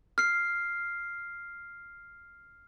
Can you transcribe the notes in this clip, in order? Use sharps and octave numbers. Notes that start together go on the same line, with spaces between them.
F6 C7